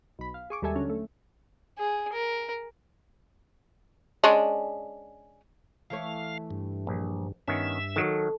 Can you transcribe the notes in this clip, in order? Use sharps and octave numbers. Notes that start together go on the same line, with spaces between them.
B1 B5
F5
G#4 C#6 D6
D#2 G3 G#3 A4 E5 G#5
D3 F#3 C#4
A3
G#4
A#4
G#3 C#4 D4
E3 A3 C#5 F5
G2
A#1
G2 D#3 B3 C#4 E5
D#3 F#3 A4